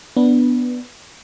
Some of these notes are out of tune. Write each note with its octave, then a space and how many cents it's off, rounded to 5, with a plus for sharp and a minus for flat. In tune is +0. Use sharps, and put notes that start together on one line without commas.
B3 +0 D4 +0 B4 -15